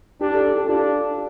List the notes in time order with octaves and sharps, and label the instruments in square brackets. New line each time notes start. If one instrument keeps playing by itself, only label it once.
[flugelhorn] D4 [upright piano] G4
[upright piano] A4
A4
G4
[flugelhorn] D4 [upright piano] F4